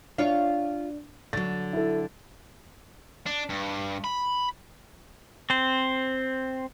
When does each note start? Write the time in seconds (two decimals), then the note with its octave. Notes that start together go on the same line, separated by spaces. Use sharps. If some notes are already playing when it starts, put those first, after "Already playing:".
0.18 D4 F4 C#5 F5
1.33 D3 F#3 A6
1.73 E4 A4
3.26 D4
3.49 G2
4.04 B5
5.50 C4 C5